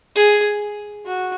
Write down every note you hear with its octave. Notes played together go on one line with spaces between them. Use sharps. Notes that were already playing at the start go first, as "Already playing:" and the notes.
G#4
F#4